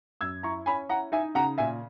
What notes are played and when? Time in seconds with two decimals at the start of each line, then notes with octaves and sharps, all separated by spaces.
0.21 F#2 E6 G#6
0.43 E4 A#5 C#6
0.66 C#4 G#5 B5
0.89 E4 F#5 A#5
1.12 D#4 E5 G#5
1.35 C#3 F#5 A#5
1.58 A#2 E5 G#5